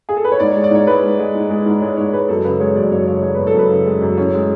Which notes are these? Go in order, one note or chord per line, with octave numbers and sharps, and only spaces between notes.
G#4
A4
B4
C#5
G#2 D5
G#3 C#5
D5
G#2 C#5
G#3 B4
G#2
G#3
G#2
G#3
G#2
G#3 C#5
G#2 C#5
C#5
G#3 B4
F#2 A4
C#3 B4
G#3 C#5
F#2 D5
F#2 C#5
C#3 C#5
G#3 C#5
F#2 B4
A4
F#2 B4
C#3
G#3
F#2
A2 C#4
G#3